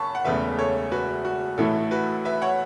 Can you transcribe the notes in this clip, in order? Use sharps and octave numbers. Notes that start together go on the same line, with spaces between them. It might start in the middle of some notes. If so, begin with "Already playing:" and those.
Already playing: F#1 F#2 A5 B5 C#6
F#5
E1 E2 C#3 A3 B4 E5
A4 C#5
F#4 B4
F#4
A1 A2 E3 A3 E4 A4
F#4 B4
B4 E5
C#5 F#5